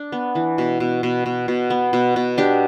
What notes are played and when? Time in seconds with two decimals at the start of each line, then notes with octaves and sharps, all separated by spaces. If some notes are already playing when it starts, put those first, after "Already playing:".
Already playing: D4
0.12 B3
0.35 E3
0.58 B2
0.80 B2
1.03 B2
1.26 B2
1.48 B2
1.70 B3
1.93 B2
2.16 B2
2.38 D4 G4